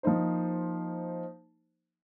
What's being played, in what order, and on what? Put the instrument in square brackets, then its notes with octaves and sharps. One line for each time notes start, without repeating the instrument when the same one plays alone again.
[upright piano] F3 A#3 D#4 C5